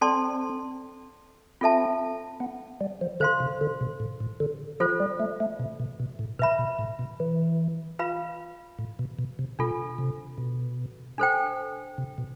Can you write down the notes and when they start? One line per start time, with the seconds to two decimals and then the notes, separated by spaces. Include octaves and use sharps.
0.01 C4 A4 D5 A5 C6
1.61 C4 F4 A4 E5 A5
2.40 B3
2.81 G3
3.01 F3
3.20 D3 C5 F5 C6
3.40 C3
3.61 D3
3.81 B2
4.00 A2
4.21 A2
4.40 D3
4.80 F3 F4 A4 C5
5.00 G3
5.20 A3
5.40 A3
5.60 B2
5.80 B2
6.00 B2
6.19 A2
6.39 B2 B4 E5 B5
6.59 B2
6.79 A2
6.99 B2
7.20 E3
7.99 F4 B4 F5 B5
8.79 A2
8.99 B2
9.19 B2
9.39 C3
9.59 B2 D4 F4 A4
9.98 C3
10.38 B2
11.18 D4 A4 C5 G5
11.98 C3
12.18 B2